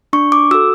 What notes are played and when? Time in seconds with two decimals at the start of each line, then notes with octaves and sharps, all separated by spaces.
0.13 D4 C#6
0.32 D6
0.51 F#4 A4 E6